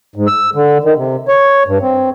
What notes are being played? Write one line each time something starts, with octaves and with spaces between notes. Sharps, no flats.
G#2
E6
D3
D#3
C3
C#5
G2
C4